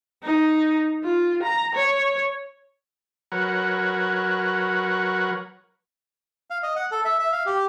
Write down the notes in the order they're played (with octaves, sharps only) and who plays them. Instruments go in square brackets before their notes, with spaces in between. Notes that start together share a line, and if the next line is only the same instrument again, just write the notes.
[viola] D#4
F4
A#5
C#5
[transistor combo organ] F#3 A#4 B4 C#5 F#5
[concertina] F5
D#5
F#5
A4
E5
E5
F5
G4